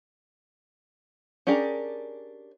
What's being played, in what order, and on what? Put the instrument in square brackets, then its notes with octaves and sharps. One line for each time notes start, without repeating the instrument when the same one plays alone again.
[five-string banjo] C#4 D4 G4 G#4 A#4